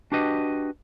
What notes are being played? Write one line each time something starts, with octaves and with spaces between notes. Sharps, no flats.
D4 F#4 G4 B4 D#5